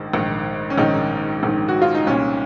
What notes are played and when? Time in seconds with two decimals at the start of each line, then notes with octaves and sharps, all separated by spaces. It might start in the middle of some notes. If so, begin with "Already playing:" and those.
Already playing: A#1 G#2 D#3
0.13 A#1 G#2 D#3
0.70 C#4
0.78 A#1 G#2 D#3 D#4
1.43 A#1 G#2 D#3
1.68 F#4
1.82 F4
1.95 D#4
2.07 C2 A#2 C#4